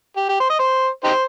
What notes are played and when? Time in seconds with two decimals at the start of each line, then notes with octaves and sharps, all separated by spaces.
0.17 G4
0.29 G4
0.40 C5
0.50 D#5
0.59 C5
1.04 D#4 G4 C5